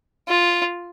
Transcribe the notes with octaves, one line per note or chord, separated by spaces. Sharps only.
F4